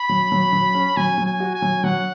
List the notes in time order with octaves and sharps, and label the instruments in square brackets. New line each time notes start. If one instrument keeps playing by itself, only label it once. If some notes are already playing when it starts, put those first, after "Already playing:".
Already playing: [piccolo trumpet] B5
[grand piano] F#3
F#3
F#3
C#4
[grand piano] F#3 [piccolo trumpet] G#5
[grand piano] F#3
[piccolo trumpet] G#5
[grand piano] F#4
[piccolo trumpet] G#5
[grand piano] F#3
[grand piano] F#3 [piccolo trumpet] F#5